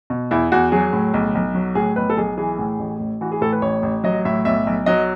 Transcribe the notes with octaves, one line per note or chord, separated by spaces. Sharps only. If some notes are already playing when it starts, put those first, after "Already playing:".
B2
E2 E4
E2 F#4
F#3 G#4
A2
B1
B1
F#3
A2 G#4
B1 B4
A4
B1 G#4
E3 G#4
A2
A1
A1
E3 F#4
G#4
A2 A4
B4
A1 C#5
A1
F#3 D#5
A2 E5
B1 E5
B1
F#3 D#5